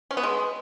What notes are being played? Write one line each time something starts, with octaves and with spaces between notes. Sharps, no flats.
C#4
B3
G#3